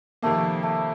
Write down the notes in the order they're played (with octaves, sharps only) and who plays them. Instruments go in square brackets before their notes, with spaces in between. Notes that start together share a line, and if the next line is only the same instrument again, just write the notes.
[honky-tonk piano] F2 C3 D#3 A#3 [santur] A3
[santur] A3